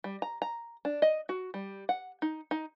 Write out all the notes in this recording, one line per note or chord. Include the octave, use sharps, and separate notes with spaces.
G3
A#5
A#5
D4
D#5
F#4
G3
F#5
D#4
D#4